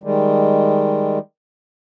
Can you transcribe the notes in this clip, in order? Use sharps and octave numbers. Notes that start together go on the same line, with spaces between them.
D#3 G3 G#3